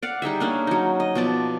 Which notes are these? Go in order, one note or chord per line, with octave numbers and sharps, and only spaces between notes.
D5 F5 F#5
G3 D#4 G#4 E5
A#3 C#4 D4
F#3 D#4
D#5
B2 F3 D5 A5